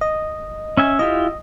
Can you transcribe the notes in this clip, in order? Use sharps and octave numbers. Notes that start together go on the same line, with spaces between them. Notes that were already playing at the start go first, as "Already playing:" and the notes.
D#5
C#4 E5 G#5
E4 F4 G4 D#5